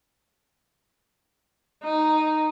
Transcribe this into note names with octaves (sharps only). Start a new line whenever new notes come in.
D#4